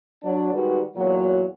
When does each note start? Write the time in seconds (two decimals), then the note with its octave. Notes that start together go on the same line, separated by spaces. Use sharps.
0.23 F#3 D4
0.52 D#3 G3 G#3 F#4 B4
0.97 E2 A#2 F#3